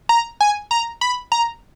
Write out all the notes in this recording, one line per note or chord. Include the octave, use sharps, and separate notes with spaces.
A#5
G#5
A#5
B5
A#5